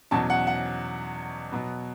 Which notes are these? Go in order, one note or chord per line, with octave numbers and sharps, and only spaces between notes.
E2 B2 F#3 C#4 A5
F#5
F#5
B2 F#3 B3